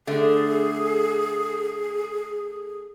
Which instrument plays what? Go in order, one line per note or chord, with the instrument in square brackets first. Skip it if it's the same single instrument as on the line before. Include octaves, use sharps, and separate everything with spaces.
[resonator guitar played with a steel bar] D3 A3 [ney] G#4